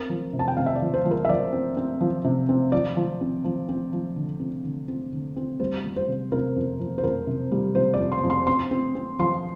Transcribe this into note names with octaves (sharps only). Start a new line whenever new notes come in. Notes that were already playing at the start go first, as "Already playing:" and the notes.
Already playing: C4 A#4
F3
C3
A5
G5
C3 F5
E5
D5
F3
C5
F3
A#4
E5
F3 D5
C4
C4
F3
C3
C4
F3 D5
F3
C4
F3
C4
F3
D3
C4
D3
C4
D3
C4
G3 C5
G3
C5
C3
C3 A#4
F2
F2
C5
F2 A#4
C3
G3
C3 C5
D5
F2
C6
F2
C6
C4 C6
C4
C4
F3 C6